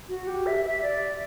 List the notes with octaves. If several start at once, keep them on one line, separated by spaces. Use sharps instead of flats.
F#4
G4
E5
E5
D5